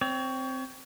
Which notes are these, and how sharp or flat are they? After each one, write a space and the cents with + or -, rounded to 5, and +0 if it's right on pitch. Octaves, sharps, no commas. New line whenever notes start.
C4 +0 C#5 +30